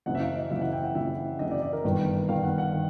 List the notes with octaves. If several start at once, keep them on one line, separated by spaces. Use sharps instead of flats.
F#1 F#2 C#3 E3 F#5
E5
F5
D#5
F#1 F#2 C#3 E3 E5
F#5
G5
F#5
F#1 F#2 C#3 E3 E5
F#1 F#2 C#3 E3 D#5
D5
D5
A#4
G1 G2 D#3 B4
G1 G2 D#3 F5
F#5
F#5
D#3